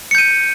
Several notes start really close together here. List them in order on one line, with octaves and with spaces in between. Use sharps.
C#7 G6 D#7